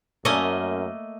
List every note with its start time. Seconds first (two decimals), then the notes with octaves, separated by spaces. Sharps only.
0.25 F#2 A3 A#3 C#4 D#5